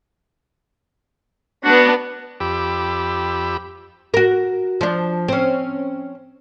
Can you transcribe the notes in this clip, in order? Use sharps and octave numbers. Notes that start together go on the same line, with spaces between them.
B3 D4 F#4
F2 G4 B5 D6 E6
F#4 A#4
F3 D4
C4 C#4